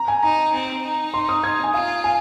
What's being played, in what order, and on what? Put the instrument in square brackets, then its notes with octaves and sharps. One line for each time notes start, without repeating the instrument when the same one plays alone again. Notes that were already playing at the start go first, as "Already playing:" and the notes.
Already playing: [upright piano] A#5
G#5
[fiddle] D#4 [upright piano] A#5
[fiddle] C4
D#4
[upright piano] C6
D#6
G#6
G#5
[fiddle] F4 [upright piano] F5
[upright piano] G#5